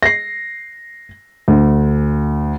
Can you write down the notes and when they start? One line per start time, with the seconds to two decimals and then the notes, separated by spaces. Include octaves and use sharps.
0.03 A#6 C7
1.48 D2